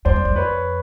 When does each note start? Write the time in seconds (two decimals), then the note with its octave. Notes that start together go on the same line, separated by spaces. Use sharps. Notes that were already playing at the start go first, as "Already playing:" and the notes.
0.05 F2 C5 D5
0.16 F#2
0.25 F2
0.36 B4 C#5